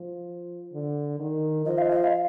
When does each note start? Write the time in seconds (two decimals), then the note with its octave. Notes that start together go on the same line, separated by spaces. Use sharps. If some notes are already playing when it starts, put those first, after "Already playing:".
Already playing: F3
0.73 D3
1.19 D#3
1.65 F3 D#5
1.78 F5
1.90 D#5
2.03 F5